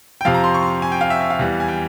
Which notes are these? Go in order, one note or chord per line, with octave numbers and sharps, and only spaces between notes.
G5
F2 C3 F3 F5
A#5
C6
C#6
C6
G#5
G5
F5
E5
E5
F5
E2 E3 G3
G#5
G5